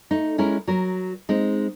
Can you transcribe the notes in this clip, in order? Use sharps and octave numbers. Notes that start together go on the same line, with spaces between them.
A3 D#4
G#3 C#4 E4 A#4
F#3 A#4
G#3 C4 D#4